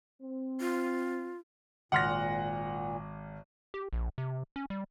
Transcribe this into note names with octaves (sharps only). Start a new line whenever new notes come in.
C4
F4
G#1 A#2 F#5 C6 F6 F#6 A#6
G4
A#1
C3
C#4
G3